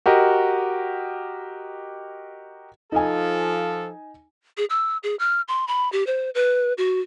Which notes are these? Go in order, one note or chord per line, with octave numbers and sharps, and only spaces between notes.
F#4 G4 A#4 D#5
F3 D#4 A4 G#5
G#4
E6
G#4
F6
C6
B5
G4
C5
B4
F#4